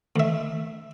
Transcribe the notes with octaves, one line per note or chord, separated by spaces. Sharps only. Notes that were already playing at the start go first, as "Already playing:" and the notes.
D2 E5